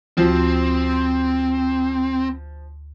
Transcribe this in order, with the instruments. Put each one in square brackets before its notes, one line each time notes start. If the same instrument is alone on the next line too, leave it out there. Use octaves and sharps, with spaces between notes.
[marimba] D2 F#4 [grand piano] F3 [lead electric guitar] C4